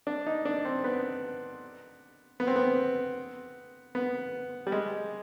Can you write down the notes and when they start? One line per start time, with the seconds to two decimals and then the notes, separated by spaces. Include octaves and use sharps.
0.07 D4
0.26 D#4
0.45 D4
0.65 C4
0.84 B3
2.40 B3
2.47 C4
2.56 B3
3.95 B3
4.67 G3
4.72 G#3